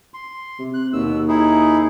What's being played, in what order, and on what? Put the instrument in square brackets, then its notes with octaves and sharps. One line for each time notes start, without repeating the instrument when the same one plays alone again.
[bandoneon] C6
[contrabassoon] C3
[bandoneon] F#6
[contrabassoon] D#2 [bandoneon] B2 E6
[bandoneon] D#4 E4 G#4